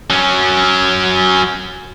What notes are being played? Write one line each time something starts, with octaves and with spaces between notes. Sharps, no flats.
F#3 C#4